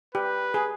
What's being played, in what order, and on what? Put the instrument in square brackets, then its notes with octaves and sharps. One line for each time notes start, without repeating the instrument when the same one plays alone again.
[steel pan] G4 [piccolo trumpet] B4
[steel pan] G#4